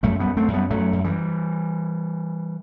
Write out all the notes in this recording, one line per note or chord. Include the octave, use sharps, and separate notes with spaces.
F#2 F#3 A3
G3 B3
F#2
A3 C4
F#2
G3 B3
F#2 F#3 A3
F#2
E3 G3